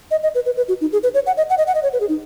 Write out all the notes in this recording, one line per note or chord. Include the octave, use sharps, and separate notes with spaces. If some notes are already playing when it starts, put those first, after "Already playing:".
D#5
D#5
B4
B4
B4
F#4
D#4
G#4
B4
C#5
F#5
D#5
F#5
D#5
F#5
D#5
C#5
B4
G#4
D#4